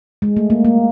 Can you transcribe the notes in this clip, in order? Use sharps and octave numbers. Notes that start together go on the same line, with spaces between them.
G#3
A3
A#3
A#3